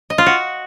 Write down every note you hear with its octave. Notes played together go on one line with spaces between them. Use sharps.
D#5
F4
F#4